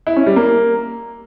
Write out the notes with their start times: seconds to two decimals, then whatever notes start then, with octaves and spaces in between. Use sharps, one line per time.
0.07 E4
0.16 C#4
0.26 G3
0.36 A#3